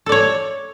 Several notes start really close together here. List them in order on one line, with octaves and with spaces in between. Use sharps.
A4 D5 C#5